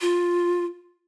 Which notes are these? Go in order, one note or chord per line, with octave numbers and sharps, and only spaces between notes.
F4